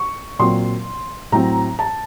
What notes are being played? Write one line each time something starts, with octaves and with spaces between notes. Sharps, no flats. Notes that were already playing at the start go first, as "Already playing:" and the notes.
Already playing: C#6
A#2 F#3 C4 F4 C6
A2 F#3 C4 A#5
A5